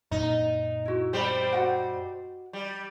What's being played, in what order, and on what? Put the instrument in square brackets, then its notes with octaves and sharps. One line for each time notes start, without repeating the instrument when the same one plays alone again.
[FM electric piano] F#2 A#2 [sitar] D#4
[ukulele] E4 F#4
[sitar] G3 C4 [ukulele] G4 B5
[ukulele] F#4 D#5 F#5
[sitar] G3